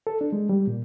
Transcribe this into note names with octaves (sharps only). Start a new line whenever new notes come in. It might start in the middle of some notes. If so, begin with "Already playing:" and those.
A4
D4
G#3
G3
A#2